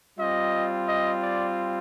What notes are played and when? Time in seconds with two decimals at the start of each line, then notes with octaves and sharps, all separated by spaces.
0.18 G3 C4 F4 D#5
0.88 D#5
1.22 D5